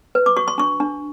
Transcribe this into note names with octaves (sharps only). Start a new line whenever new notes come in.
B4
D6
F#4 C#6
C6
D4 C#6
D4